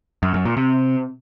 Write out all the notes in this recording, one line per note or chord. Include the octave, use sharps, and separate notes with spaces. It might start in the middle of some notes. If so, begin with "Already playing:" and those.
F#2
F#2
A#2
C3